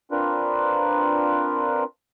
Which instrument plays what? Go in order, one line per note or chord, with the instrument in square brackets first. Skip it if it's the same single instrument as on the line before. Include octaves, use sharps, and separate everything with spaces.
[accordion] C4 D4 F4 A#4 B4